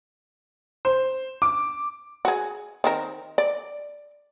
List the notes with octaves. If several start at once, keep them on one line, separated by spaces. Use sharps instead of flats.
C5
D6
F#4 G#4
D#3 C4 A#4
D5